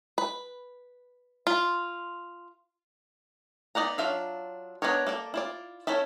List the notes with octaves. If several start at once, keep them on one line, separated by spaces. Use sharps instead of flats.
B4
F4
B3 D#4 D5 F#5 A#5
F#3 D4 F4 E5 F5
B3 D4 D#4 A#4 C#5
A#3 A4 D5
E4 F4 D5
B3 C#4 E4 A4 E5